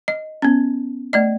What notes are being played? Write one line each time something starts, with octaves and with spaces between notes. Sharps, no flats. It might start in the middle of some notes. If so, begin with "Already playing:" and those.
D#5
B3 C#4
A3 D5 D#5